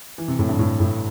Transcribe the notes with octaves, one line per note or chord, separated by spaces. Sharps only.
E3
C3
A2
G2
A2
A2